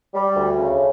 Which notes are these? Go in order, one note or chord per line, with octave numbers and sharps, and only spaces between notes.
G3
D2
C#3